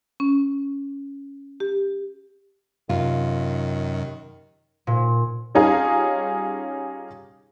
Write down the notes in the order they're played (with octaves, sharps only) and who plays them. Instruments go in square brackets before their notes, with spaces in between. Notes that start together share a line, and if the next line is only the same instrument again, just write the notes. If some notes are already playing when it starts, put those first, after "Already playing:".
[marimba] C#4
G4
[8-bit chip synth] F#2 [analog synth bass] C3 [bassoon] D#3 [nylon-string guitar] F4
[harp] A#2
[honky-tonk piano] G3 C#4 D#4 F4 G#4